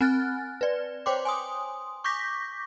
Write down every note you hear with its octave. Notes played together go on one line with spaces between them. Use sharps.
C4 G#5 F6 F#6 A6
B4 D5
C5 C#5 G5 C6 D6
G#5 C6 D#6
C#6 D6 G6 A#6 B6